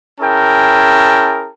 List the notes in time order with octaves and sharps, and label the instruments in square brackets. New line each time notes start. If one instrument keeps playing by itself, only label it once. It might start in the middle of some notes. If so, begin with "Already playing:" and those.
[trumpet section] C#4 E4 G#4 A#4 G5 A5